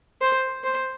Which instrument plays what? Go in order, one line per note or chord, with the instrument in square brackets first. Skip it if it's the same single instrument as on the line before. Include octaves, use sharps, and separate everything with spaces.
[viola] C5
C5